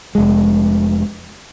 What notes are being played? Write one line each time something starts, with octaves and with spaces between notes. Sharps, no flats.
F1 G#3